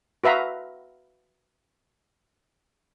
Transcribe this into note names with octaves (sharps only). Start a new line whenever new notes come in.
F#4 B4 E5 F5 A#5